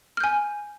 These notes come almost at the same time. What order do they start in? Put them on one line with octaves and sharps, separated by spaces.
F6 G6 G#5